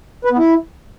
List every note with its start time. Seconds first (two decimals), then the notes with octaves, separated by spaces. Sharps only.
0.25 B4
0.31 B3
0.38 E4